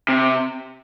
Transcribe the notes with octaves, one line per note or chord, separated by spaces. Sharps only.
C3